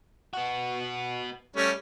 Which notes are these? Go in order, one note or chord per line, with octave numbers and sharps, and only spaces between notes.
B3 F#4
G3 A3 C#4